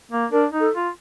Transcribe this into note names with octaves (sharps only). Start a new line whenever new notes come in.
A#3
D4 A#4
D#4
A4
F4